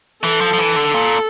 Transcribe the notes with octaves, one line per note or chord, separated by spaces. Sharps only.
E3 A4
F3
F3
E3
D3
A#2